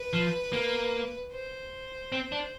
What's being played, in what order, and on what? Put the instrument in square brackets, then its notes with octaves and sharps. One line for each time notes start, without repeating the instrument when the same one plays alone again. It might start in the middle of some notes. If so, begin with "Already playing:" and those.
Already playing: [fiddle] B4
[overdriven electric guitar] F3
A#3
[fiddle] C5
[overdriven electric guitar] C4
D4